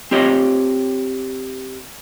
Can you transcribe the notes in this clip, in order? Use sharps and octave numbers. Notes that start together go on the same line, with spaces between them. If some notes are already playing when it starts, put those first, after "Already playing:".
C4 F4 G4 C#5 D#5